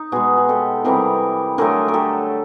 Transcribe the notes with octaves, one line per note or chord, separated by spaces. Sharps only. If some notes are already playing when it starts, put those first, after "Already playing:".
Already playing: D#4
B2 G#3 F#4 G#4
G#4
G4 A4
C3 E3 G3 G#4 A#4
D3 F#3 A3 G#4 A#4
A#4
G4 A4